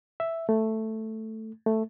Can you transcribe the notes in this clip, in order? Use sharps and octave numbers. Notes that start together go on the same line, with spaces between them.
E5
A3
A3